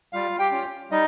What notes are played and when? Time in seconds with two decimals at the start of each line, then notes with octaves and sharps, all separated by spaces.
0.13 G3 F4 F5
0.39 G4 G5
0.52 C#4 F4
0.91 G3 D#4 D#5